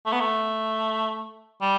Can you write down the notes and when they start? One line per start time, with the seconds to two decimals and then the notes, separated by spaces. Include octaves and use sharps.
0.06 A3
0.12 B3
0.20 A3
1.61 G3